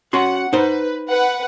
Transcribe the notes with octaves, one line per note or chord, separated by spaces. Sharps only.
C#4 F#4 F#5 C6
D#4 B4 C5
B4 F#5